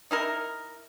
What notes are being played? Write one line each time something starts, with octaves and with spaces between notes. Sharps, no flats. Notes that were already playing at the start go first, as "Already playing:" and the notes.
D#4 E4 A#4